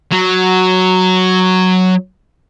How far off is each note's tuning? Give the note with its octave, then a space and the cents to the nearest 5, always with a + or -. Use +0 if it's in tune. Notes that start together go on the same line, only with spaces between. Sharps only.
F#3 +0